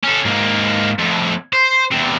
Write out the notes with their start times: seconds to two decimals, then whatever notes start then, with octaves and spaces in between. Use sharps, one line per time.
0.04 C#4 A4
0.25 G#2 A#3
0.98 F2 A2
1.53 C5
1.91 E2 C3